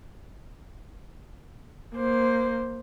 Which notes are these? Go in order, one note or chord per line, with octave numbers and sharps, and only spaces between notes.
A#3 C5